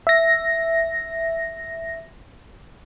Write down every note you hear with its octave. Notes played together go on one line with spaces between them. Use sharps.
E5 A#6